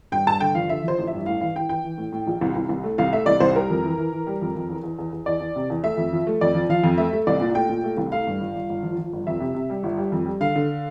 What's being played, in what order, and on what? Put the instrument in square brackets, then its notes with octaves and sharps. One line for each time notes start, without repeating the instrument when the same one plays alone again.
[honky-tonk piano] G2 G5
G2 A5
D3 G5
F3 F5
D3 E5
F3 C5
A1
E5
G2
A2 F5
E3 F5
E3 G5
E3 G5
E3
A2
A2
A#1
C2
C2
C2
A3
C2 F5
A3 E5
C2 D5
C2 C5
G3 A#4
F2
E3
E3
E3
G3
F2
F2
E2
E2
E2
E2
E2 D5
E2
C3
E2
A3 E5
F2
F3
A3
F2 D5
F3
F3 F5
F2
A3 E5
A3
C2 D5
A#2
A3 G5
A#2
A3
C2
A3 F5
G2
G1
G1
G1
F3
F3
G1
F2 E5
C3
C3
G3
G1
G3
F2
G3
D3 F5
D3